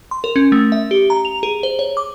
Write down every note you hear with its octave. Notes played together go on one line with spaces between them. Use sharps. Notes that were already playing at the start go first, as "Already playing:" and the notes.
C6
A#4
C#4
A3
E5
G4
A#5
F7
G#4
C5
C#5
D6